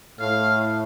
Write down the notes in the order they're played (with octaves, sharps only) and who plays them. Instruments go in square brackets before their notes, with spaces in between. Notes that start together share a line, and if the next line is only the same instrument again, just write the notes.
[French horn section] A2 [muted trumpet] F5